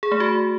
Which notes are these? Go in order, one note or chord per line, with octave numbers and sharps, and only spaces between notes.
G#4
A3
F#4